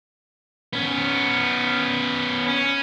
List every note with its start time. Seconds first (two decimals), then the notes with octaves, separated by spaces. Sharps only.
0.73 B3 C#4
2.48 C#4